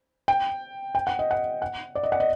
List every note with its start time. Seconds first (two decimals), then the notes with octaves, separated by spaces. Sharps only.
0.28 G5
0.95 G5
1.07 F#5
1.19 D#5
1.31 F#5
1.62 F#5
1.95 D5
2.03 D#5
2.12 F#5
2.20 D#5